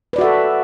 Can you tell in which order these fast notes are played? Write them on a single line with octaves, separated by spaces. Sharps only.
B4 D5 F#4 E5 A4